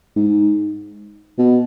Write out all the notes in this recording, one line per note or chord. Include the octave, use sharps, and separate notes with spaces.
G#2
B2